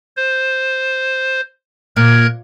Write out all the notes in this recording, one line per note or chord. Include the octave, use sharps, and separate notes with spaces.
C5
A#2 A#4 F#6 G#6